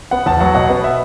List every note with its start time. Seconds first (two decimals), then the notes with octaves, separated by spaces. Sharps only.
0.11 B3 F#5
0.26 E2 A5
0.40 F#3 F#5
0.55 B2 F#5
0.70 B3
0.84 E5